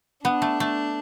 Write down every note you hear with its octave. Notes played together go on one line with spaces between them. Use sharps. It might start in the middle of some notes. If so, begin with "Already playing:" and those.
B3 D4
A3
A3